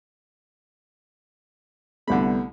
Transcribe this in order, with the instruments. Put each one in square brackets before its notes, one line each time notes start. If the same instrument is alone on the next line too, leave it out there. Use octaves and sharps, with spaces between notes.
[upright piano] C2 A3 [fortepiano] D3 B5 [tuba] B3